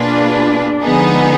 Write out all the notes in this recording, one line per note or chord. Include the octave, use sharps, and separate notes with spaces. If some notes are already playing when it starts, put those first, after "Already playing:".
Already playing: B2 A#3 D4 F4 G#4 B4
D3 F3 G#3 B3 D#4 G#4